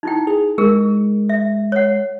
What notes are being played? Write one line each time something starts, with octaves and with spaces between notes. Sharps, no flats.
D#4 E4 G5
G#4
G#3 G#4 A#4
E5
C#5 F#5